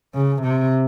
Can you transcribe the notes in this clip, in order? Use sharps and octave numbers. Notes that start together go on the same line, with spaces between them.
C#3
C3